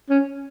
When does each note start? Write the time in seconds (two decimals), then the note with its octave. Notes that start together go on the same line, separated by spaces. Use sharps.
0.09 C#4